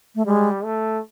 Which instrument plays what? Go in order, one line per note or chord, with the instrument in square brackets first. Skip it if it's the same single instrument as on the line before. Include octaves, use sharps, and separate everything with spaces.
[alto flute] A3
[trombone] G3 [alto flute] G#3
[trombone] A3